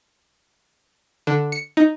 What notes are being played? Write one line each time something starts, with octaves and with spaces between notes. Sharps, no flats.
D3
C#7
D#4